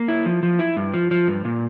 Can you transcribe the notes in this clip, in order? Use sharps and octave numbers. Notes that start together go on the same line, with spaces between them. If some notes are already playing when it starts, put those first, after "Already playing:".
Already playing: A#3
E4
F3
F3
E4
G2
F3
F3
G2
A#2